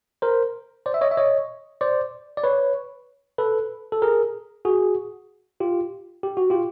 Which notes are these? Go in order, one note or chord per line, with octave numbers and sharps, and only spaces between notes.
A#4 C5
C5 D5
E5
C#5 D#5
E5
C#5 D#5
C5 D5
D5
B4 C#5
A4 B4
A4
G#4 A#4
F#4 G#4
F4 G4
G4
F#4
F4 G4